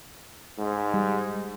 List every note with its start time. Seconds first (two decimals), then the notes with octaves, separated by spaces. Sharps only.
0.58 G#2
0.94 G3